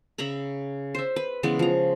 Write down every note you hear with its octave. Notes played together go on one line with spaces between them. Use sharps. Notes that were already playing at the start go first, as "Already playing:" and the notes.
C#3 E5 A#5 B5
C5 E5
B4
C#3 E3 G#3 B3
F3 A#5